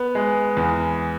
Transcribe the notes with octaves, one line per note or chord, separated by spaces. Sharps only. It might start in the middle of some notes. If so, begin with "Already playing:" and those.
Already playing: B3
G#3
E2